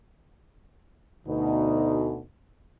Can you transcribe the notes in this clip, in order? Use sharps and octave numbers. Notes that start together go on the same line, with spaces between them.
D2 B2 D#4